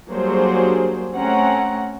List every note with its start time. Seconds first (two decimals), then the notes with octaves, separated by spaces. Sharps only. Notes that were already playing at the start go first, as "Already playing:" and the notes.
0.10 F#3 G3 A#3 D4 G#4 C5
1.14 A3 C4 C#4 F#5 A#5